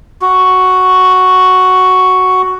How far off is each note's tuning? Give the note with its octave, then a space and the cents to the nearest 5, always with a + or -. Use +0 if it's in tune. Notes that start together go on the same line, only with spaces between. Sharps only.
F#4 +0